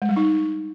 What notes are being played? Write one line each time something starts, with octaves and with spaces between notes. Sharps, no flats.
G#3
G3
D#4